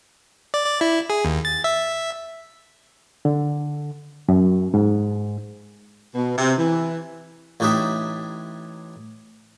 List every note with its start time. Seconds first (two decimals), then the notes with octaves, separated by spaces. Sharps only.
0.54 D5
0.66 D5
0.81 E4
1.10 G#4
1.25 D#2
1.45 A6
1.64 E5
3.25 D3
4.29 F#2
4.74 G#2
6.15 B2
6.37 C3
6.57 E3
7.60 A1 A2 D4 D#4 G4 E5